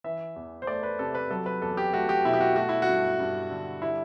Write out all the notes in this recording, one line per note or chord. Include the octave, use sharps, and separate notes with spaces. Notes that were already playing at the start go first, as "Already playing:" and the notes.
E3 E5
E2
C5
A3 D5
B4
C3 A4
B4
F#3 A4
B4
E2 A4
G4
A3 F#4
G4
B2 E4
G4
F#4
A3 F#4
E4
F#4
G2
G2
D3
G3 E4